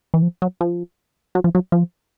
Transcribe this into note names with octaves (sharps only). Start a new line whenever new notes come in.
E3
F3
F#3
F3
F#3
F3
F#3
F3